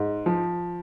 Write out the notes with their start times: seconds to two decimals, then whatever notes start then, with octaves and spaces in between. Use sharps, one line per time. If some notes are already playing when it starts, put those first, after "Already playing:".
Already playing: G#2
0.26 F3